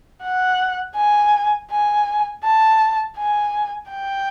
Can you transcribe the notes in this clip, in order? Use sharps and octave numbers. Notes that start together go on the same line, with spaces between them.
F#5
G#5
G#5
A5
G#5
G5